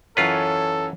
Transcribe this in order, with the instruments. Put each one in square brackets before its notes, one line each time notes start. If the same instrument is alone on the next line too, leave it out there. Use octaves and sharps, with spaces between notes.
[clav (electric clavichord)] F#2 F4 B4 [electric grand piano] E3 C#4 C#5 [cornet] A4